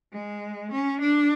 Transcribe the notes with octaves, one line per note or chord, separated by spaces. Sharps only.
G#3
C#4
D4